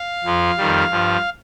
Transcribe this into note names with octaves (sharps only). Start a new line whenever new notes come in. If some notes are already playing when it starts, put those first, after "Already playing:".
Already playing: F5
F2 F3
F2 D#3 G3
G2 F3